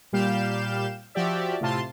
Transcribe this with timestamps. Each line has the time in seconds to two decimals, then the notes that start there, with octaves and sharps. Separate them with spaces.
0.13 A#2 G3 G4 F5 G6 E7
1.15 F3 F#4 G4 D5 E5
1.61 A2 C3 F4 A5 C6